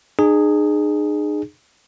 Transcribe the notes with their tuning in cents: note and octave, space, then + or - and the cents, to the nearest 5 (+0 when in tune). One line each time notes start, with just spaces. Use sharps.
D#4 -45 G#4 +0